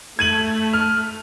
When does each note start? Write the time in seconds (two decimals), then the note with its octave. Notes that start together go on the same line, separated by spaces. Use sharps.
0.19 A3 G#6 D#7 F#7
0.73 F6